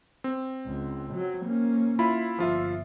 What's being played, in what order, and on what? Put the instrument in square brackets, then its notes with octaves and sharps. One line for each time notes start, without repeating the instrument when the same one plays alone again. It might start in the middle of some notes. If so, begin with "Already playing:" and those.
[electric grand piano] C4
[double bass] C#2
F#3
A#3 C#4
[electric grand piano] E4 F4 B5
[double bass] G1 [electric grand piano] F3 F4 E5